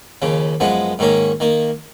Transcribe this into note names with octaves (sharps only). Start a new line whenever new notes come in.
D#2 C#3 F3
F#2 F3 G#3 B3
G#2 D#3 A#3 C#4
D#3 A#3